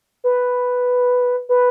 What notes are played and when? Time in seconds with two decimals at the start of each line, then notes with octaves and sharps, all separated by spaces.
0.24 B4
1.49 B4